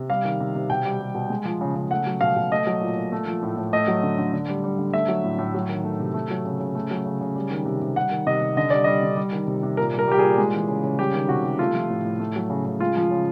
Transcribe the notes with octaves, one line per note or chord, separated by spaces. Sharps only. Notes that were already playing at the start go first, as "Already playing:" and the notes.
Already playing: C3
G3 F5
D#3
C3
C3
B2 G5
G3
G3
B2
G#3
F3
C#3
C#3
A3 F#5
F#3
B2 F5
B2
A3 D#5
F#3
A#2
A#2
A3
F3
A2
A2
A3 D#5
F#3
D3
D3
D3
G3
G3
D3
A3 E5
F#3
A2
A2
F#3
D#3
A3
C3
A3
F#3
C#3
C#3
A3
F#3
C#3
C#3
G3
D#3
C3
C3
G3 F#5
D#3
C3 D#5
C3
D3 D#5
G3 D5
G3 D#5
D3
G3
D#3
C3
C3
A#2 A#4
G3
A#4
G3 G4
A#2 G#4
G#3
E3
C#3
C#3
G3 G4
D#3
C3 F#4
C3
A3 F4
F3
A2
A2
A3
F#3
C#3
C#3
G#3 F4
F3
C#3